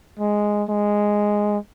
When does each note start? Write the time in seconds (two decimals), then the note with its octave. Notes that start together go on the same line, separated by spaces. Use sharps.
0.19 G#3
0.69 G#3